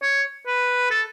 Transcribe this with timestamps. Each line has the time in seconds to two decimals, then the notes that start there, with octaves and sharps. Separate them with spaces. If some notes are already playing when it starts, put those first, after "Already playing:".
0.02 C#5
0.47 B4
0.91 A4